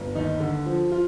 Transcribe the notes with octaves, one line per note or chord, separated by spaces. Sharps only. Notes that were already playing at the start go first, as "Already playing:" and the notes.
Already playing: G1
D#2 D#4
D3
F3
F4